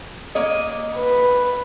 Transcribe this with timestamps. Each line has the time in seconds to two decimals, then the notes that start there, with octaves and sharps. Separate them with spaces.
0.35 A#3 C#5 D#5
0.96 B4